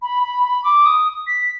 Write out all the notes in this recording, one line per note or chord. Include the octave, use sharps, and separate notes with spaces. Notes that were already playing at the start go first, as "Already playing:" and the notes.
B5
B5
B5
D6
D#6
B6